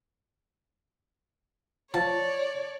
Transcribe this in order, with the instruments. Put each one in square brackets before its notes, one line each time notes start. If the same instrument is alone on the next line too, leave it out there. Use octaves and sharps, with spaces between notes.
[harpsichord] F3 [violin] C#5 D5 [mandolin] A5